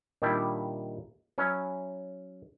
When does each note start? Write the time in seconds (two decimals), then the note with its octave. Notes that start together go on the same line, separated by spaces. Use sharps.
0.22 A#2 D#3 G3 D4 E4
1.38 F#3 C#4 E4